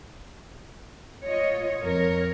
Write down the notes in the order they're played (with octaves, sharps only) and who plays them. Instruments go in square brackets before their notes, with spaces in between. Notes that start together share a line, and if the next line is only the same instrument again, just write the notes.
[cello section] F4 C#5 D#5
F2 A#4 C#5